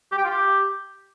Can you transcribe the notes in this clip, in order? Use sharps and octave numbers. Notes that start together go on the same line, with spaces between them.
G4
G5
F4
G4